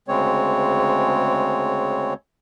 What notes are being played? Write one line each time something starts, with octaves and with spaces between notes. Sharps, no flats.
D2 C#3 G#3 C4 C#5